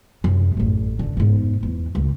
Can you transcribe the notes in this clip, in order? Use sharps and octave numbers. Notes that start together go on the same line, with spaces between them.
F#2 C3
A1 A2
F#2 D3
G#2 B3
E2
C#2